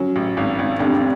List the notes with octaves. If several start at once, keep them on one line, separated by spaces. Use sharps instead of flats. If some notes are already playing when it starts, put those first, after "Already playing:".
Already playing: F#3 C#4
A1
G#1
G#1
F1 C4 D4
C4